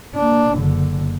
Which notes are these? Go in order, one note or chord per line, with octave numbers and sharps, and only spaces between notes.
A#3 D4
F#1 D3